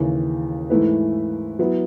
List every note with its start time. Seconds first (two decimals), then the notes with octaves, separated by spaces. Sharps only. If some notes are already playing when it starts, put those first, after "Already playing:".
Already playing: D#2 C#3 E3
0.70 G#2 E3 A3 E4 B4
1.59 F#3 B3 E4